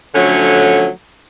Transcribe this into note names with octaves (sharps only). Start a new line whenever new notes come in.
D3 F3 F#3 A3 C#4